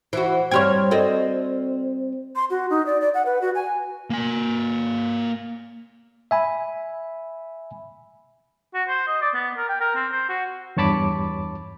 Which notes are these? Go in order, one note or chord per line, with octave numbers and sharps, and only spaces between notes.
E3 F#4 C5
G2 G3 C4 C#5 G5 C6 F6 G#6
C4 F#4 A4 D5 D#5
C6
F#4
D#4
D5
D5
F#5
B4
F#4
G#5
A#3 G#5
E5 G#5 B5
F#4
C5
D#5
D5
B3
A#4
G5
A#4
C4
C5
F#4
E2 G2 C#5 A5 B5 D6